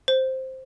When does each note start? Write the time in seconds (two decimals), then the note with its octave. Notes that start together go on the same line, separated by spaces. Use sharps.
0.08 C5